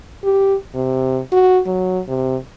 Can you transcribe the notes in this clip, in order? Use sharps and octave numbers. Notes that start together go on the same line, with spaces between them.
G4
C3
F#4
F#3
C3